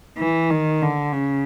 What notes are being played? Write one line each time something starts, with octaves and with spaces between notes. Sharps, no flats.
E3
D#3
D3
C#3